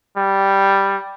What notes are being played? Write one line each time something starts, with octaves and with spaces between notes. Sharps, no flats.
G3